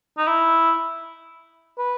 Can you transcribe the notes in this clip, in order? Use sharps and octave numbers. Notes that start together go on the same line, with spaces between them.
D#4
E4
B4